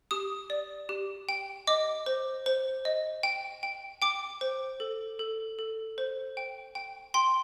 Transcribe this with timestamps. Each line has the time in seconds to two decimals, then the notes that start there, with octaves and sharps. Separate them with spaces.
0.11 G4 D#6
0.50 D5
0.89 G4
1.29 G5
1.67 D#5 D6
2.06 C5
2.46 C5
2.85 D#5
3.23 G5
3.63 G5
4.02 G5 D6
4.41 C5
4.80 A4
5.19 A4
5.59 A4
5.98 C5
6.37 G5
6.75 G5
7.14 G5 C6